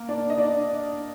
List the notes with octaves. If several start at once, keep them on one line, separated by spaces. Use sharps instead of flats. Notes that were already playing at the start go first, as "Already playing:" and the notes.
Already playing: A#3 A#4
D4 D5
D#5
D4 D5